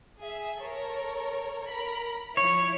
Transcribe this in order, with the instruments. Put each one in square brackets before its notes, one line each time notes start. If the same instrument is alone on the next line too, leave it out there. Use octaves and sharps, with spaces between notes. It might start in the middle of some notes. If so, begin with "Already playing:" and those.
[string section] G#4 E5
A4 A#4 C#5
A#4 B5
[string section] F3 E4 [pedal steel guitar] C#5